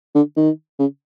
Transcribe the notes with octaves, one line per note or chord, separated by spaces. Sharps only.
D3
D#3
C#3